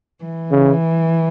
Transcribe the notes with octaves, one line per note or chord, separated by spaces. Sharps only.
E3
C#3